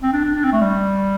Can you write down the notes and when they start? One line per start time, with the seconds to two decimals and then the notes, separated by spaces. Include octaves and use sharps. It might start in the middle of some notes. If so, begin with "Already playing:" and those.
0.03 C4
0.13 D4
0.24 D4
0.36 D4
0.44 C4
0.52 A3
0.61 G3